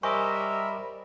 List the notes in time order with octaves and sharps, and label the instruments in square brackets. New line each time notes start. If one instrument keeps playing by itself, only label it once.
[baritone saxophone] G3 [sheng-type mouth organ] A#4 E5 [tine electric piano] C5 D#5 D6 [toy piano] G#5 C#6